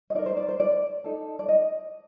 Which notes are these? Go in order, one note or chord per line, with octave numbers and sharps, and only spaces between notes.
D#5
D#4 A#4 D5
C5
D5
C5
D5
D#4 A4
D5
D#5